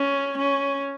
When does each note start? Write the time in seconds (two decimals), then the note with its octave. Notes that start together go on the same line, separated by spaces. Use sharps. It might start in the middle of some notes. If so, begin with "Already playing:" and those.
Already playing: C#4
0.38 C#4